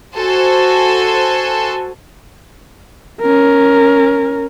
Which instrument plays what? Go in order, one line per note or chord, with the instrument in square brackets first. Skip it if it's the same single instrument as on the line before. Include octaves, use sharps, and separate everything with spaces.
[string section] F#4 A4 C5 G#5
[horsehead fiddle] C#4 A#4